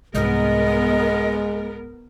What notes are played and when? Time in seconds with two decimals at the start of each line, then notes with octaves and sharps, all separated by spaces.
0.15 C2 G#2 G#3 B3 A#4 D#5